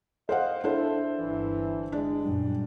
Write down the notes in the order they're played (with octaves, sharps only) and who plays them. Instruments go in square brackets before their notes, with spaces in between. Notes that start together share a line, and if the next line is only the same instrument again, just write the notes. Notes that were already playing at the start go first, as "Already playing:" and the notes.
[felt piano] C5 F5 F#5 [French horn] D#5
[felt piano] D4 E4 C5 [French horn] A4
[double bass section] G1 [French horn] E3
[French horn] G#3 [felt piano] D4
[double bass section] F#2 A#2 G3